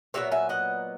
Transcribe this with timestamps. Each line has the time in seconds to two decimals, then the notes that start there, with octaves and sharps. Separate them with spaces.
0.14 A#2 F#3 B3 C#5 E5
0.31 E5 G#5
0.49 D#5 F#5